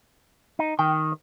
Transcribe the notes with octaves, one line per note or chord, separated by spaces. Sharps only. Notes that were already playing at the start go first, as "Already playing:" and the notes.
D#4
D#3 G5